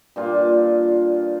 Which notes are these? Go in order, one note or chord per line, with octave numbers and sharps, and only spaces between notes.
G2 A#2 F4